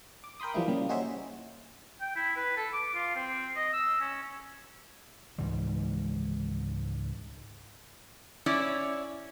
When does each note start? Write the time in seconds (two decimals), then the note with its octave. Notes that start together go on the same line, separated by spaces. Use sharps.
0.24 D6
0.40 A#4 G5 B5 C6 D#6
0.54 E3 F3 G3 A#3 E4
0.68 A#2 C#3 G3 A#3
0.89 D#4 F#4 G#4 C5 C#5 E5
2.01 G5
2.15 E4
2.36 B4
2.57 A4
2.73 D6
2.94 F4
3.15 C4
3.56 D#5
3.73 E6
4.01 C#4
5.38 C#2 G#2 E3 G3
8.46 C#4 E4 C#5 D5